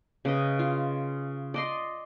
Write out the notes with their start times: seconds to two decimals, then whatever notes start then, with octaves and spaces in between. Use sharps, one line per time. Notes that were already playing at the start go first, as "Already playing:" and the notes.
0.25 C#3 B4 D#5
0.59 F4
1.54 D5 D#5 C6